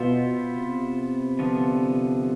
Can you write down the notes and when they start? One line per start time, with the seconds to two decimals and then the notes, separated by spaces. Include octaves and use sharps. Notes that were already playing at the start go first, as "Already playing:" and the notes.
Already playing: B2 B3 F4 C5 E5
0.56 C3
1.39 D3 F3 B3 F4